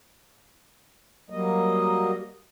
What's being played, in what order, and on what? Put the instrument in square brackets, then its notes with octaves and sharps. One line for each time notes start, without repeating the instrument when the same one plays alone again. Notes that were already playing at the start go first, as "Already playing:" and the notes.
[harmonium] F#3 G3 A#3 D#5